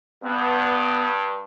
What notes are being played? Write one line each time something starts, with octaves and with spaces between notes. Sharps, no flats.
G2 B3